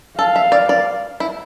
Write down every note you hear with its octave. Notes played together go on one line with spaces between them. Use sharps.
A4 F5
E5
D5
D5
E4